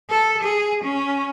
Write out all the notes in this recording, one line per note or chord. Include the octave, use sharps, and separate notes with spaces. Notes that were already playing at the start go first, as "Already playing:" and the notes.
A4
G#4
C#4